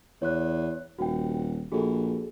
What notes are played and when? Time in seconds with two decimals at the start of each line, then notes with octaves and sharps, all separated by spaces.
0.22 E2 C#5 F#6
0.98 D#1 F#4 G5
1.72 A#1 F#4 G#4 A4